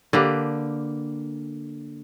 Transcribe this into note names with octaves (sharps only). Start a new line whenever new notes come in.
D3 A#3 G4 B4